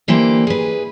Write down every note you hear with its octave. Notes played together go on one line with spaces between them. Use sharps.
D3 E3 A#3 G4 C5
G#4 B4